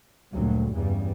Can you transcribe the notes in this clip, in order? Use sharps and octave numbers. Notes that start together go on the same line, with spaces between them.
F#1 D2 A#2 F#3 G3
E2 G2 C#3 G3